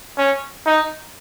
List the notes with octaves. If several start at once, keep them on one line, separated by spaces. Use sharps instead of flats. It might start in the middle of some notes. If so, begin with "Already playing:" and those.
C#4
D#4